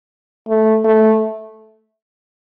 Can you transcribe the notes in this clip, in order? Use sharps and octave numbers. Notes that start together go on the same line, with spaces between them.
A3
A3